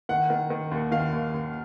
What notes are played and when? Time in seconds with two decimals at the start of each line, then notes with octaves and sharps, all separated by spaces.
0.09 D#3 F#5
0.30 D#3
0.50 D#3
0.71 D#2
0.92 D#3 F5
1.12 D#2
1.34 D#2